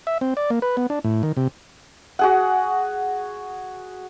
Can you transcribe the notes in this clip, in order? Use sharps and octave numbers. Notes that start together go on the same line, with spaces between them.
E5
C4
D5
A#3
B4
B3
D4
A2
D#3
C3
F#4 G#4 F#5